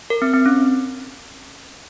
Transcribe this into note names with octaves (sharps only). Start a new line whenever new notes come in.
A#4
C4
C4
C#4